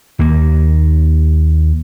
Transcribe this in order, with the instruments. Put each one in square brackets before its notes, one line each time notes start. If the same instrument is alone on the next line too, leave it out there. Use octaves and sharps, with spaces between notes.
[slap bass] D#2 A#3